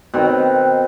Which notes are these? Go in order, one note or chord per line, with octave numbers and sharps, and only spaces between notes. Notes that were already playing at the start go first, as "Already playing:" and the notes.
B2 D#3 C4